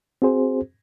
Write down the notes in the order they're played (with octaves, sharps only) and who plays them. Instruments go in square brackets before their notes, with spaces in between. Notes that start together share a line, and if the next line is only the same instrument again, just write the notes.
[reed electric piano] C4 F#4 G#4 C5